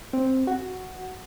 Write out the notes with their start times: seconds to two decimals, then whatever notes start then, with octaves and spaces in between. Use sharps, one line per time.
0.13 C4
0.47 F#4